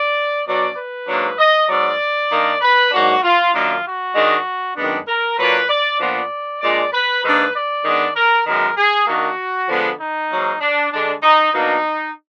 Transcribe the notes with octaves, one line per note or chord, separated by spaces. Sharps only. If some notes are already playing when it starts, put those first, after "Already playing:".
Already playing: D5
B2 F#3 D4 D5
B4
G#2 F#3 A#3 D4
D#5
G#2 F#3 B3 D5
D#3 A#3 D4
B4
G#2 F#3 A#3 D4 F#4
F4
F#2 D#3 A#3 D4 F4
F#4
D#3 G#3 D4
F#2 D#3 G#3 B3 D4
A#4
A#2 F#3 A#3 D4 B4
D5
A#2 F3 B3 D4 D5
A#2 G#3 D4 D5
B4
G#2 D#3 A#3 D4 B4
D5
D#3 G#3 B3 D4
A#4
F#2 D#3 G#3 B3 A#4
G#4
D#3 A#3 D4 F#4
D3 F3 G#3 B3 D4
D#4
G#2 F#3 A#3
D4
D3 G#3 D4
D#4
B2 A#3 D4 D#4